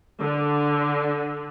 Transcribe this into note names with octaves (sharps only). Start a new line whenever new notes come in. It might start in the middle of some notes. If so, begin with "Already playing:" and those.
D3